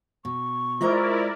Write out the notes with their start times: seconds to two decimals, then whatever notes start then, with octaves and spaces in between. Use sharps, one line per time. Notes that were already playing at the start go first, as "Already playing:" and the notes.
0.25 B2 C#6
0.81 G#3 E4 F4 A#4 C5 D5 D#5 A#5